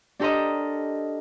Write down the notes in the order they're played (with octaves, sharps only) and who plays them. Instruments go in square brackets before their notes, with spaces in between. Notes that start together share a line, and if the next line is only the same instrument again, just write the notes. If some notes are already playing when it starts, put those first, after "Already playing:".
[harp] D4 G4 A4 A#4 C5 D#5